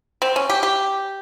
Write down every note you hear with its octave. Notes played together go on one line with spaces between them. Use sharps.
C4
C#4
G4
G4